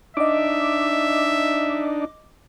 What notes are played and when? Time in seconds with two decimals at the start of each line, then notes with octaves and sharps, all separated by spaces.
0.17 D4 D#4 D#5 E5 D6